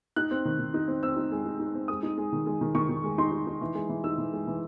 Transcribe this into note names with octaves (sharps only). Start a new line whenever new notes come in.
D#4 F#6
C4
D#3
D#3
D#4
C4
C4 E6
D#4
G#3
D#4
D#4
C4
G#3 D#6
D#4
G#3
D#3
G#3
D#3
D#3 C#6
D#3
G#3
D#4 C6
D#4
D#4
E3
G#3
E3
D#4 E6
E3
G#3
E3